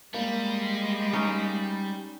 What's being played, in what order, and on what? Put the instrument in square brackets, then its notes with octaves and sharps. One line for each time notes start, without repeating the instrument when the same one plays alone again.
[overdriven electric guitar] G3 [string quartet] G#3 [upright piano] A#3
[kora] C#4 D#4